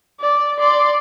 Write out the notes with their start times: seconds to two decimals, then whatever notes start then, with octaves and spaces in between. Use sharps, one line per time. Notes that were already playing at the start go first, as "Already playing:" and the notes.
0.20 D5
0.60 D5 C6